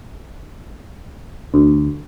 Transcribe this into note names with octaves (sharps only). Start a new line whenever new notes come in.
D2